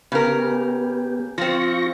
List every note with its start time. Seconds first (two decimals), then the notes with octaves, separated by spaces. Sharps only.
0.12 C#3 B3 G4 A#4
1.38 F3 C4 F4 C#6 A#6